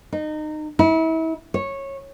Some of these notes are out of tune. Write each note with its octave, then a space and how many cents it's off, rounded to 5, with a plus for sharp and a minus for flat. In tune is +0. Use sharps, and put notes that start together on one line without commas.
D#4 -25
E4 -35
C#5 -15